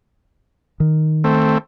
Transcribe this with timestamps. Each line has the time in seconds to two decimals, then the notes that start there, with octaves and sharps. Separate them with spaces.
0.80 D#3
1.24 A3 C4